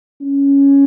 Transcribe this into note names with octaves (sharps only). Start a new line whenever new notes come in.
C#4